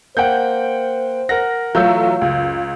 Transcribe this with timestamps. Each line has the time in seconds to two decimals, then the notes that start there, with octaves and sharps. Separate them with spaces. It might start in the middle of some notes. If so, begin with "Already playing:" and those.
0.17 A#3 C5 F#5 G5 G6
1.29 A#4 F#5 A#6
1.75 E3 F#3 A3 F4 F5 E6 G6
2.21 C#2 F#2